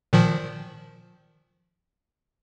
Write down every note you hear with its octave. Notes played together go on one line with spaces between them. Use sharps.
A#2 D#3 F3